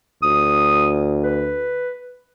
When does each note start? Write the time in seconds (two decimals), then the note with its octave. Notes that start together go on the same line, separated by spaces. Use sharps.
0.23 D2 D#6
1.24 B4